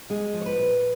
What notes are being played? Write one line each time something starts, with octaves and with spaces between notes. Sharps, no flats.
G#3 G#4
F3
C#5
B4
A#2